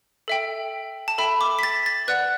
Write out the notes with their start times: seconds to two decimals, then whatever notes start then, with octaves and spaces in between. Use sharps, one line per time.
0.28 A4 E5 G5
1.08 A5
1.18 A4 E5 G5 B5
1.41 D6
1.59 B6
1.63 A6
1.86 A6
2.08 B4 D5 F#5 F#6